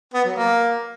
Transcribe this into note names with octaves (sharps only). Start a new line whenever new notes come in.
B3
F#3
A#3